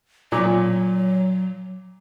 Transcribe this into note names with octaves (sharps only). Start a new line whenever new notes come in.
A#2 F#3